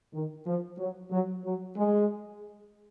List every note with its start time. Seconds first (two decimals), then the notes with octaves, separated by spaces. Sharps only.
0.14 D#3
0.47 F3
0.79 F#3
1.11 F#3
1.44 F#3
1.77 G#3